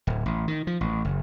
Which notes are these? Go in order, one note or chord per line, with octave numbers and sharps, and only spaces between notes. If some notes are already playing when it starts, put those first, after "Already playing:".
D1
A1
D#3
F3
A1
F#1